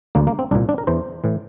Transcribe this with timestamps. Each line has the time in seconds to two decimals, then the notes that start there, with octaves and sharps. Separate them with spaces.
0.15 D2 D3 A#3
0.27 A#3
0.39 C4
0.51 C2 D4
0.55 A#2
0.69 D4
0.78 A#4
0.87 E2 E3 C5
1.24 A2 E3